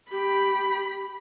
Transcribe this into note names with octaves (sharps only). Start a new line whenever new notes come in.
G4 B5